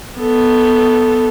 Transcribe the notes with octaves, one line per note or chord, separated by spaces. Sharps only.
B3 A4